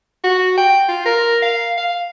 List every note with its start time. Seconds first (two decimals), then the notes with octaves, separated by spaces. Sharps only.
0.24 F#4
0.57 G5
0.88 F4
1.05 A#4
1.42 F5
1.77 F5